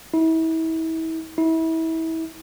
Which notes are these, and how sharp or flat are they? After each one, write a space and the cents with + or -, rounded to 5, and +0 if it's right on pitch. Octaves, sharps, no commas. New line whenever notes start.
E4 -35
E4 -30